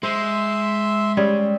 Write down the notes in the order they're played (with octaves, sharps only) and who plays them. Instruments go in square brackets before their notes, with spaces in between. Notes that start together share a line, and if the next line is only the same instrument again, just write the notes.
[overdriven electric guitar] G#3 [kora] C5 [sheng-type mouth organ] E5 C6
[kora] G3 C#4 G#4